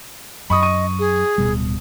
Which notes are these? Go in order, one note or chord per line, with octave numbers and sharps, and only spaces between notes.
F#2 D#5 B5 C#6 D#6
C#6 D#7
G#4
D1 B2 G3